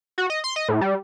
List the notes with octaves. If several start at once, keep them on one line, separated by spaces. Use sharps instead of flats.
F#4
D#5
C6
D#5
A2
G3